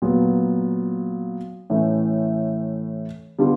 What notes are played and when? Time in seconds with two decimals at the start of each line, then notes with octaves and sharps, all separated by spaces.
0.02 A#2 F#3 B3
1.70 A2 E3 A3 C#4
3.39 D3 G3 B3 D4 F4